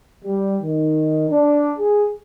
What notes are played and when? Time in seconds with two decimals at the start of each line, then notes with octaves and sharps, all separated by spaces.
0.23 G3
0.61 D#3
1.30 D4
1.78 G#4